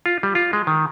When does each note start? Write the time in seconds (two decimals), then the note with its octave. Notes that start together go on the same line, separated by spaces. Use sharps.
0.06 F4
0.23 G3
0.35 F4
0.53 G#3
0.67 D#3